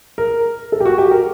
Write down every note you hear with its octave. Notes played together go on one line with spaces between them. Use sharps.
A#4
A4
G4
F#4
G4
A#4